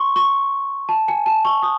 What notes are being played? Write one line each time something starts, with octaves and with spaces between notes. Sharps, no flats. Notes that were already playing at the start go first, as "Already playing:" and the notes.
Already playing: C6 C#6
C#6
A5
G#5
A5
C#6
D#6